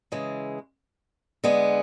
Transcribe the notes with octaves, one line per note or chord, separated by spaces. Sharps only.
C#3 E3 G#3
D3 G#3 B3